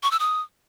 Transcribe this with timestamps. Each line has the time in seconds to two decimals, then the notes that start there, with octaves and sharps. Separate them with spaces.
0.03 C#6
0.11 E6
0.20 D#6